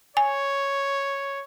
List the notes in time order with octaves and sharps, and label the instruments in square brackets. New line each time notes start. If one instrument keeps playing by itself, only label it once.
[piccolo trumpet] C#5 [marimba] G#5